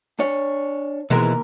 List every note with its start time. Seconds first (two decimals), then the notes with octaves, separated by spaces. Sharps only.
0.19 D4 C#5
1.10 D#2 B2 E3 G#3 A#4